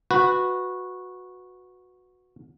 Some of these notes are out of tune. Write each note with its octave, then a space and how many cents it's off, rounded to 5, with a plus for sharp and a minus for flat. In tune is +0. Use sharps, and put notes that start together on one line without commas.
F#4 -15 B4 +0